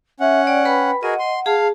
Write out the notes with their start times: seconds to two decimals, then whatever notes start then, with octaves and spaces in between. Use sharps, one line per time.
0.20 C#4 E5 F#5
0.47 D5 G5
0.65 B4 G5 B5
1.03 F#4 G#4 A#4 D#5 F#5
1.19 C6
1.46 G#4 F5 A5